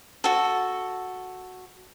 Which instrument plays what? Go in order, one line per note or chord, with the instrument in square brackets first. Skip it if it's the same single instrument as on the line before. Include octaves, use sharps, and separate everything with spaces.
[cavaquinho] F#4 A4